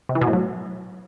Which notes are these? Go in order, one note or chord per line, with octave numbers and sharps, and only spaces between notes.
C3
E3
B2
A2
F#3